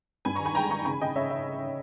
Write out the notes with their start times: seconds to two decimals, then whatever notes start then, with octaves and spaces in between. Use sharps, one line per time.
0.25 G2 G#5 B5
0.35 D#3 A#5 C#6
0.45 G#5 B5
0.55 G#3 G5 A#5
0.70 D#3 A#5 C#6
0.85 C#3 G#5 B5
1.00 C#3 D#5 G5
1.16 C#3 C#5 E5
1.30 C#4 E5